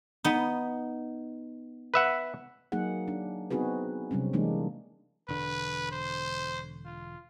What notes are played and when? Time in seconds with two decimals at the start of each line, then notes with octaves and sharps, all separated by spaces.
0.24 B3 D#4
1.94 B4 E5 F#5
2.72 F#3 A#3 D#4 G#4 F#5
3.08 D4
3.50 B3 C4 D#4 F#4 G#4 B4
4.11 C3 F#3 G3 C4 C#4
4.33 E3 G#3 A#3 D4 D#4
5.29 E1 D3 B4
5.91 C5
6.85 F4